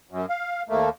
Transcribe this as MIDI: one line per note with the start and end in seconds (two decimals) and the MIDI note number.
0.11 0.26 42
0.30 0.63 77
0.69 0.90 39
0.69 0.90 57
0.69 0.90 58